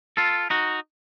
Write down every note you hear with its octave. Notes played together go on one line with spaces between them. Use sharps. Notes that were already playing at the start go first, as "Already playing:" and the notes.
F4 A4
D#4 F#4